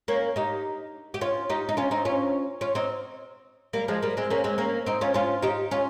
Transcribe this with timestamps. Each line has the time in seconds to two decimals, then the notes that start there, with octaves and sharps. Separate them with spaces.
0.08 A#3 C#4
0.36 D#4 G4
1.14 G4
1.21 C#4 F4
1.50 D#4 G4
1.69 D#4
1.77 C#4 F4
1.91 C4 D#4
2.05 C#4 F4
2.61 C#4 F4
2.75 C4 D#4
3.73 G3 A#3
3.88 F3 G#3
4.02 G3 A#3
4.17 G#3 C4
4.30 A#3 C#4
4.44 G#3 C4
4.58 A#3 C#4
4.86 C4 D#4
5.01 C#4 F4
5.14 C#4 F4
5.42 D#4 G4
5.71 C#4 F4